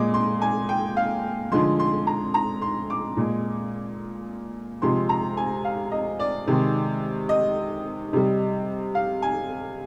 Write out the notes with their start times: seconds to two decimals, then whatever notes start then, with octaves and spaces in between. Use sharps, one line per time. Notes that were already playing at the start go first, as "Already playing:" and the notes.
Already playing: A#2 G#3 D6
0.14 C6
0.42 G#5
0.69 G5
0.97 F5
1.52 D3 F3 G#3 C6
1.79 C6
2.07 A#5
2.34 A#5
2.62 C6
2.90 D6
3.17 A#2 G#3
4.82 C3 F3 G#3 C6
5.09 A#5
5.37 G#5
5.65 F5
5.92 D#5
6.19 D5
6.47 C3 D#3 G#3
7.29 D#5
8.13 C3 G3
8.95 F5
9.22 G#5